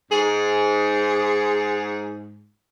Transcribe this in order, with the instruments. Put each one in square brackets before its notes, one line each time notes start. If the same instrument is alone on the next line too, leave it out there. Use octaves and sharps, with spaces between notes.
[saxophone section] G#2 [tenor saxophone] G#4